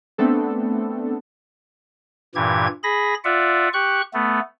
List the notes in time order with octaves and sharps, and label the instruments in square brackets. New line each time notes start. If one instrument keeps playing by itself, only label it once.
[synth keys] A3 B3 C4 D4 A4
[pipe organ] G2 A#2 E3 G4 G#6
G#4 B5 A#6
F4 D5 E5 F#5
G4 C#6 F#6
A3 B3